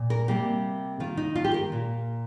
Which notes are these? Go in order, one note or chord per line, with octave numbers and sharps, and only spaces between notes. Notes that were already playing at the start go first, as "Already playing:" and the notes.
Already playing: A#2
A#4
C3 G3 A#3 G4
D#3 A#3 F4
D#4
F4
G4
A#4
A#2 A#3